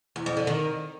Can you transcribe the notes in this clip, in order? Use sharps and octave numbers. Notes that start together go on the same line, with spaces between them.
E2
F2
D3
D#3